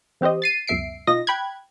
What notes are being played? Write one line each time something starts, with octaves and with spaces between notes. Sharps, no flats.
E3 C4 G4 C5 D#5
A6 C7 D#7
C#2 F#2 B2 E5 C7 D7
B2 D#4 F4 D#5 A#6
G5 B5 F#6 G#6